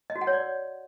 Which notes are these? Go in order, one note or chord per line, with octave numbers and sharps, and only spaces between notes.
D#5
F#4
F#5
C#5
D5